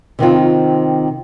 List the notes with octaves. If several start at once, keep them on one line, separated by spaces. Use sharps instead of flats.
C3 D#3 C4 F4